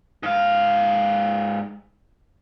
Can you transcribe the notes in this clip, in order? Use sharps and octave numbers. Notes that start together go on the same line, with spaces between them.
G#2 F5